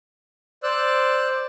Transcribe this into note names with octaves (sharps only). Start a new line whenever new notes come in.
C5 D5 E6 F#6